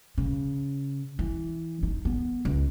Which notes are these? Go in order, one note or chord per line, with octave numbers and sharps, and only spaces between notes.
C#3
E3
D#4
B3
C#2